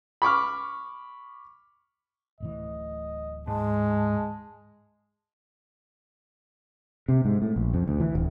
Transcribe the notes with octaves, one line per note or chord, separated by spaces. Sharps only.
B5 C#6 D6 F6
D1 A2 E3 D#5
G#2 G#3 A5
C3
G#2
A2
A#1
F2
D2
E3
D1